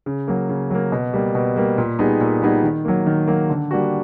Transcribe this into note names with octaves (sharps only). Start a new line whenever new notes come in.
C#3
F#3 A#3
C#3
F#3 A#3
B2
G3 A#3
B2
G3 A#3
A#2
G3 B3 D#4 G#4
A#2
G3 B3 D#4 G#4
D#3
F#3 A#3
D#3
F#3 A#3
D3
G3 A#3 D4 F#4